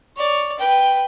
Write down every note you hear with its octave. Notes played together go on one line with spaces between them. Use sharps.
C#5 D5
B4 G5